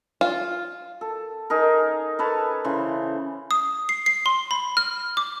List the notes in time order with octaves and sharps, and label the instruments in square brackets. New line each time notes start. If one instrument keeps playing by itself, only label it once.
[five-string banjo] F4
[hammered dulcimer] A4
D#4 G#4 A#4
A4 B4 C#5 A5
C#3 E3 C5
[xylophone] D#6
C7
C7
C6
B5
F6
D6